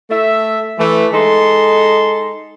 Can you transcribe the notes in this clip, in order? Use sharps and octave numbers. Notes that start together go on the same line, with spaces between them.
A3 E5
E3 A3
G#3 D#4 A4 C6